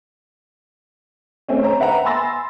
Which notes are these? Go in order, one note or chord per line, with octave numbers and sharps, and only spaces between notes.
A3 C4 C#4
C5 C#5 A#5
B4 E5 F#5 G5 A#5
G#5 B5 C6 E6 A6 A#6